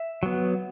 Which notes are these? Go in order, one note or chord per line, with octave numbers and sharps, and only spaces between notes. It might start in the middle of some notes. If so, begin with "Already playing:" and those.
Already playing: E5
F#3 B3